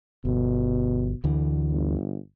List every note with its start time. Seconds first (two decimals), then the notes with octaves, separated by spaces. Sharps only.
0.25 G1 B2
1.24 D2 D3 E3
1.72 G1